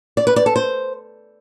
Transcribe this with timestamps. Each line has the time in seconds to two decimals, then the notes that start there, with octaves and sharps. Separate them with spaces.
0.17 D5
0.27 B4
0.36 D5
0.46 A4
0.56 C5